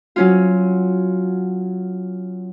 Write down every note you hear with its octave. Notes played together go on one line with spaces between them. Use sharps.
F#3 C#4 F4